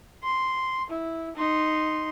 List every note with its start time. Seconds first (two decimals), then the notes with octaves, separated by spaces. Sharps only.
0.23 C6
0.90 E4
1.36 D#4 C6